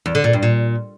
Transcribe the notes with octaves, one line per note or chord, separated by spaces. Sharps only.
E2
D3
A#2
G2
A#2